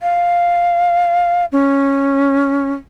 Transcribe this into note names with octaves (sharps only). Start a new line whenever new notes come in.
F5
C#4